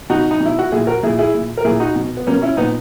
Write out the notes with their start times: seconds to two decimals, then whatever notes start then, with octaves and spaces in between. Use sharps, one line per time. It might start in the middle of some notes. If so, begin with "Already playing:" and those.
0.10 B2 D#4 F#4
0.31 D#4
0.40 B2
0.45 E4
0.59 F#4
0.72 A#2 E4 G#4
0.87 F#4 A#4
1.03 A#2 E4 G#4
1.19 E4 G#4
1.34 A#2
1.57 A#4
1.64 A#2 E4 G#4
1.80 D#4 F#4
1.96 B2
2.17 B3
2.27 B2 A#3 C#4
2.42 C#4 E4
2.57 A#2 B3 D#4